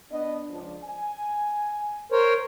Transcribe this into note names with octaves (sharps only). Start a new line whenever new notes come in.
B3 D4 D#5
C#2 F3 D4
G#5
A#4 C5 C#5